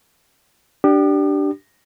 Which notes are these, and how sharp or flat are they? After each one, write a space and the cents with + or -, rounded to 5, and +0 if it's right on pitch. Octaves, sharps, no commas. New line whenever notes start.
D4 +0 G4 -20 D6 +45